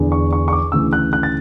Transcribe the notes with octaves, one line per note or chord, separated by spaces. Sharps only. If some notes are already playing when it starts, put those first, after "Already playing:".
Already playing: E2 D3
C#6
C#6
C#6
D6
D2 C#3 E3 E6
F#6
F#6
A6